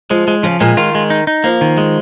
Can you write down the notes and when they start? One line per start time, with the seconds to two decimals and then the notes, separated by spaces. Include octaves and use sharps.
0.10 F3 G#3
0.28 G#3
0.43 C#3 F3
0.60 A#2 G#3
0.77 D#3 F4
0.95 G#3
1.10 D#4
1.27 D#4
1.44 F3 A#3
1.61 D#3
1.77 G#3